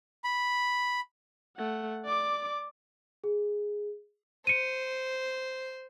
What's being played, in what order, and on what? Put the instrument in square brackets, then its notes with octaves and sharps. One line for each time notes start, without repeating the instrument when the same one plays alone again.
[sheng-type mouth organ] B5
[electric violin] A3 F#5
D5 D6
[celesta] G#4
[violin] C5 [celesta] C#7 D#7